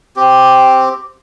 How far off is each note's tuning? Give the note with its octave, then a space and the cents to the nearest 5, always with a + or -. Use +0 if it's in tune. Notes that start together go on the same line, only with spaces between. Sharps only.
C4 +0 G4 +0